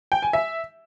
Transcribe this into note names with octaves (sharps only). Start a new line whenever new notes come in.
G5
G#5
E5